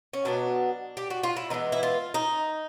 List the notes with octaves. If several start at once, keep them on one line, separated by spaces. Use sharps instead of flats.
C#4
B2 F#3 B3 D4
G4
F#4
F4
E4
E3 G#3 B3 D#4
E4
F4
D#4